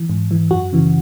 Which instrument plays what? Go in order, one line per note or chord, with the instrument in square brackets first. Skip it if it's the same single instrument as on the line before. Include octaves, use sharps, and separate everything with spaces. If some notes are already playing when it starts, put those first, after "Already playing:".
Already playing: [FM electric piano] E3
G#2
E3
F#2 F#4
C#3 E3